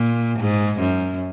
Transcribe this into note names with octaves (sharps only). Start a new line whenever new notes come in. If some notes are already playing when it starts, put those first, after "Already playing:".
Already playing: A#2
G#2
F#2